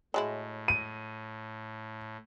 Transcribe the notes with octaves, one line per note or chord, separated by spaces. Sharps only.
A2 F#3 G#3 E4
D#7